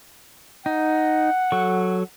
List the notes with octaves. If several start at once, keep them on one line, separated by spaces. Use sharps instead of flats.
D#4 F#5
F#3 A4 C#6